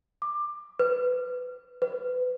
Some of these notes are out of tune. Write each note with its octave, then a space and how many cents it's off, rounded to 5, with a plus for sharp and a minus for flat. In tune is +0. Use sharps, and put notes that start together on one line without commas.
D6 +20
B4 +15
B4 +25